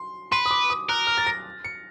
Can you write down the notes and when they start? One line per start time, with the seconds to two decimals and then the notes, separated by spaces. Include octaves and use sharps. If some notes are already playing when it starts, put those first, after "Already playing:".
Already playing: C6
0.32 B4 C6
0.46 D#6
0.51 D6
0.70 D#6
0.89 A#4 F#6
1.07 F6
1.17 A6
1.27 A#6
1.64 C#7